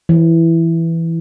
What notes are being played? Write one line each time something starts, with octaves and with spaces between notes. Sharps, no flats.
E3